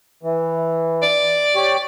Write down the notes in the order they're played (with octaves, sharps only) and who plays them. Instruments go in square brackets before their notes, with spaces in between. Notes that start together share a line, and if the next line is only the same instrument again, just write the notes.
[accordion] E3
[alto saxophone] D5
[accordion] G4 C#5